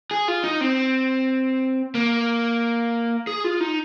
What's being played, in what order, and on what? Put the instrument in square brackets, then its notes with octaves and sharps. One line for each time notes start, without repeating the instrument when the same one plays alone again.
[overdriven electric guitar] G#4
F4
D#4
C4
A#3
G#4
F4
D#4